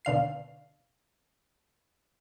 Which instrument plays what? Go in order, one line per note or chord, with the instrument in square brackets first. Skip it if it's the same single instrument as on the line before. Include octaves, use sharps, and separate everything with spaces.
[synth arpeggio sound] B2 D3 F5 C7